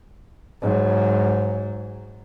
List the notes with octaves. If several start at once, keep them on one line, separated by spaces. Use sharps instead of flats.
G#2 F#3